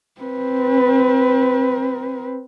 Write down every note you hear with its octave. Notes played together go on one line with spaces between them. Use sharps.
C4 B4